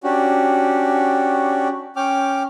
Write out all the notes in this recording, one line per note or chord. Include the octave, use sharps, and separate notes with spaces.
C#4 D4 F#4 G4
C#4 G5 D6 F6